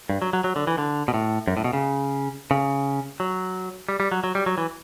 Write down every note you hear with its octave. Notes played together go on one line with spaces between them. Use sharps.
G2
F#3
F#3
F#3
D3
E3
D3
B2
A2
F#2
A2
B2
C#3
C#3
F#3
G3
G3
F#3
F#3
G3
F#3
E3